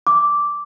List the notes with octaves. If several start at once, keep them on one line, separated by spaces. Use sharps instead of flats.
D6